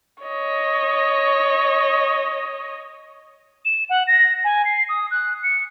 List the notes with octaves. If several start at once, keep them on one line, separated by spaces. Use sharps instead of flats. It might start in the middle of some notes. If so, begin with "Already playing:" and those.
C#5 D#5
E7
F#5
A#6
G#5
C7
D#6
F#6
C#7